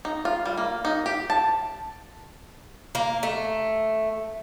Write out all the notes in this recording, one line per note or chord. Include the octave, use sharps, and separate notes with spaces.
D#4
F4
G3
A#3
D#4
G4
A5
A#3
A3